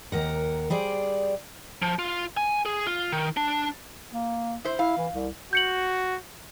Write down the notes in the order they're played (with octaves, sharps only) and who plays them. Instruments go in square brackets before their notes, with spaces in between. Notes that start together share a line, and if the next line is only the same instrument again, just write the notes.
[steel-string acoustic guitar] D#2 A#4 F#5
G3 G#4 C5 D5
[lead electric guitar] F3
F4
G#5
G#4
F4
D#3
D4
[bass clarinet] A#3
[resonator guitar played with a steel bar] E4 C5
[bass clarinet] E4 [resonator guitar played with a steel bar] F5
[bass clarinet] E3
C2
[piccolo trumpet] F#4 [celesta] G6 C#7 F#7